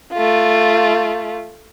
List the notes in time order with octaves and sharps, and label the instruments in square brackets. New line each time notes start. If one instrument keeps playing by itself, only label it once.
[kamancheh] A3 F4